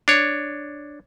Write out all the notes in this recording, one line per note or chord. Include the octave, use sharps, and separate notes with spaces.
D4 C#5